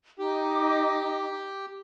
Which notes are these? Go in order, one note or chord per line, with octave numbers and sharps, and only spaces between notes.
D#4 G4 D6